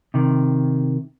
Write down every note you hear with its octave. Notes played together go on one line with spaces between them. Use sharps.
C3 D#3